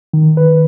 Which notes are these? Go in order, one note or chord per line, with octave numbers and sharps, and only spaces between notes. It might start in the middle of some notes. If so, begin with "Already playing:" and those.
D#3
B4